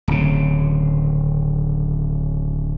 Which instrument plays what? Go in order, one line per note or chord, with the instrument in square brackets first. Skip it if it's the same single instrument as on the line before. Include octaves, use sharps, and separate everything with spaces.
[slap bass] D1 C#3